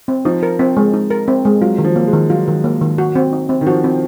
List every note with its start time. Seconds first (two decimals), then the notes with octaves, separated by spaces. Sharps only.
0.08 C4
0.25 F3 D#4
0.43 A#4
0.59 C4
0.77 G#3
0.93 D#4
1.11 A#4
1.28 C4
1.45 G#3
1.61 F#3 F4
1.78 D#3
1.85 F3
1.96 A#3
2.07 G#3
2.13 D#3
2.30 F#3 F4
2.48 D#3
2.64 A#3
2.82 D#3
2.98 F#4
3.15 C4
3.33 D#4
3.49 C4
3.61 D#3
3.67 F3 F#4
3.84 C4